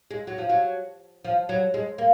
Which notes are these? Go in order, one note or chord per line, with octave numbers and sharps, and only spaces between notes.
G#3
F#3
F3
F#3
F3
F#3
G#3
A#3